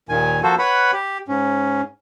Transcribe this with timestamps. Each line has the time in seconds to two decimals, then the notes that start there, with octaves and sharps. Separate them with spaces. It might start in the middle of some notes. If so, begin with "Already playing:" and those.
0.09 D#2 A#2 D#3 G#5
0.43 F3 A#3 F#4 A4 C5
0.58 B4 C#5 F#5 B5
0.93 G4
1.28 G#2 C#4